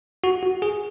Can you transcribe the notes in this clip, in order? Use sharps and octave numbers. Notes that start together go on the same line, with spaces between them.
F#4
F#4
G#4